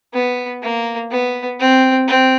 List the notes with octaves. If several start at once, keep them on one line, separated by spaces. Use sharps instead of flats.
B3
A#3
B3
C4
C4